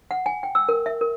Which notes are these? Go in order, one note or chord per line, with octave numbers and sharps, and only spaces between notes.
F#5
G#5
G5
E6
A#4
E5
A#4